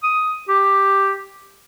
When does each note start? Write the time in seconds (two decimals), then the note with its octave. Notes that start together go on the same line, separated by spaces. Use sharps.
0.03 D#6
0.48 G4